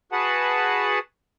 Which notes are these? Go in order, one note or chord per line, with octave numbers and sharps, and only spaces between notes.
F#4 G#4 B4 F#5 A5